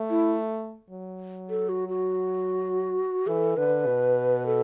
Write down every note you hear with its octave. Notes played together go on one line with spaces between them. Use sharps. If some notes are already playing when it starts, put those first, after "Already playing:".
Already playing: A3
E4
F#3
A4
F#4
F#4
E3 A4
D3 B4
B2
A4